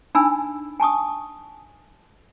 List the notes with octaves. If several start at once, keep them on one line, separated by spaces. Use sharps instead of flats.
D4 D#4 G#5 B5 E6
G#5 A5 C#6 D#6